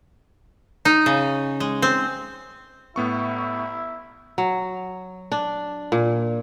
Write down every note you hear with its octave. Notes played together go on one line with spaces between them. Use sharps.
D#4
C#3
G#3
C4
A2 B3 E4 C#6
F#3
D4
A#2